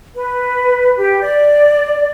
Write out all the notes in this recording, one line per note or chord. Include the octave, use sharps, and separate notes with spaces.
B4
G4
D5